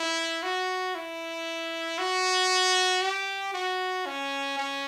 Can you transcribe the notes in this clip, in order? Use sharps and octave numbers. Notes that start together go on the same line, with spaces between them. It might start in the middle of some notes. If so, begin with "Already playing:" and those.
Already playing: E4
F#4
E4
F#4
G4
F#4
C#4
C#4